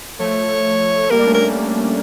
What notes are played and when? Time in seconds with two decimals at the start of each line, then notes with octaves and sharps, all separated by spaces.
0.19 F3 A3 C#5
1.00 A3
1.11 G3 A#3 A#4
1.19 D4
1.26 A3 C#4
1.34 A#4